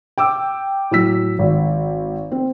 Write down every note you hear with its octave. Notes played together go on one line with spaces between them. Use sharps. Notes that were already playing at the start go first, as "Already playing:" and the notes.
G5 D6 E6
A2 F#3 E6 B6
G#1
C4